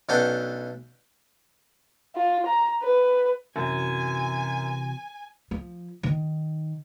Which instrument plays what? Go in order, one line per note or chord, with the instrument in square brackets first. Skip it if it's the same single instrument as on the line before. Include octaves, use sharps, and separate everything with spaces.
[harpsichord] B1 B3 C#4 D4 A4 G5
[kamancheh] F4
A#5
B4
[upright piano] F#2 [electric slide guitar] C3 E3 F#4 [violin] G#5
[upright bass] F3
D#3